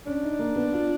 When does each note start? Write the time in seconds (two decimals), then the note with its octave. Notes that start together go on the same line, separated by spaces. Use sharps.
0.06 C#4 D4
0.23 D#4
0.39 A#3
0.56 B3
0.72 F4